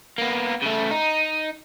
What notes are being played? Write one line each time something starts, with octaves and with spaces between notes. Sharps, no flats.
A#3 B3
C#3 A3
D#4